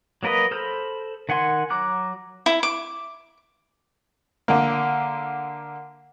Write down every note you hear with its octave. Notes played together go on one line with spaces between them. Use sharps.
F#3 A#3 A#4 B4 D#5
A4 C5 B5 F6 G6
D#3 F#5 G#5 C6
F#3 A#5 D6 F#6
E4
D6
D3 A#3